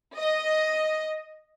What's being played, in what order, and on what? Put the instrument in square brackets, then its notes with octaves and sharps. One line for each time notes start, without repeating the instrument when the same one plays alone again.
[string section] D#5